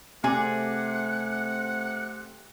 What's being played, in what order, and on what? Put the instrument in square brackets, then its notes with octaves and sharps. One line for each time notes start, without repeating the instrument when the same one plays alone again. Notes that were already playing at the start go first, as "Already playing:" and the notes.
[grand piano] C3 [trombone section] A3 C4 [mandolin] G#4 D5 [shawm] F#5